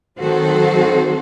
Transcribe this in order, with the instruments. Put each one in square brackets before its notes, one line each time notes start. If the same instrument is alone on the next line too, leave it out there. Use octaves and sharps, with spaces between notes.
[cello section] D#3 F#3 C4 F#4 A4 C5